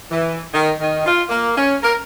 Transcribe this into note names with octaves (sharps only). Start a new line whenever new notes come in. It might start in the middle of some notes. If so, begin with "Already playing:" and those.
E3
D#3
D#3
F4
A#3
C#4
A#4